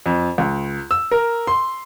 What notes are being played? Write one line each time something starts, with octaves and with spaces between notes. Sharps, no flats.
F2
C#2
E6
A#4
C6